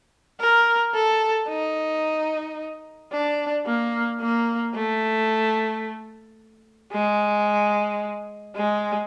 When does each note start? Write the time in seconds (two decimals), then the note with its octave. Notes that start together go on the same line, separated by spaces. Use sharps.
0.40 A#4
0.94 A4
1.48 D#4
3.12 D4
3.66 A#3
4.21 A#3
4.75 A3
6.92 G#3
8.56 G#3